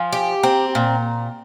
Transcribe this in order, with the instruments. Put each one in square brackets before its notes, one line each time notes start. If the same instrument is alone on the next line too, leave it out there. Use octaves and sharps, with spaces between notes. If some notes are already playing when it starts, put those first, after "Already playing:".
Already playing: [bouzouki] F3 [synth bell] F5 G#5
[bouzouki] G4
[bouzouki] C4 [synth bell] G5 A#5
[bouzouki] A#2